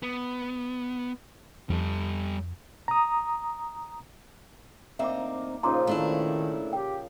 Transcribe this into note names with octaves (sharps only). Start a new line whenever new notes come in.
B3
F2 G3 A4
A#5 D#6
D2 A#3 C4 D#4 E5 A#5 D6
A#2 C#3 F3 D#4 A#5 C6 D6
D#3 A3 D4 E4
G4 G5